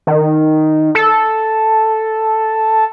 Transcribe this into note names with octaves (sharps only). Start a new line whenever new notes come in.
D#3
A4